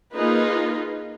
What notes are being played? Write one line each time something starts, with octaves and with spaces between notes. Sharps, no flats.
A#3 D#4 F4 G#4 B4